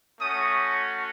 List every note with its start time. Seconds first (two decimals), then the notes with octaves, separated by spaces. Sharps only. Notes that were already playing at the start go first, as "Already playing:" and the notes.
0.20 A3 C#4 F#4 D#6